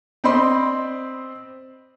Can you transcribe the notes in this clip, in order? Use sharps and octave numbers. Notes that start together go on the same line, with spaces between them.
C4 D5 D#5 B5 C6